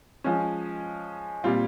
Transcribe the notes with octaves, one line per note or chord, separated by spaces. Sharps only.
F3 G#3 C#4
A#2 G3 C4 F4